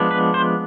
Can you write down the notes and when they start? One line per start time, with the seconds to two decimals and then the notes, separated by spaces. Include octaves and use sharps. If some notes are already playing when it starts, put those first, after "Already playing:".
Already playing: F3 G#3 B3 D4
0.11 B4
0.34 C5